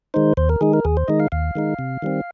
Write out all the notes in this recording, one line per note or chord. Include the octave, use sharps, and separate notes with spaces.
D#3 G#3 D#4 C5
D#2 C5
A#4
D#3 G#3 D#4 G#4
A#4
D#2 G#4
C5
D#3 G#3 D#4 D#5
F5
D#2 F5
D#3 G#3 D#4
C3
D#3 G3 C4